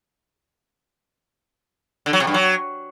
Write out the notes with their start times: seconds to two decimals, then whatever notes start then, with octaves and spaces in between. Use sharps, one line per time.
2.06 D3
2.13 F#3
2.20 C3
2.27 G2
2.34 F#3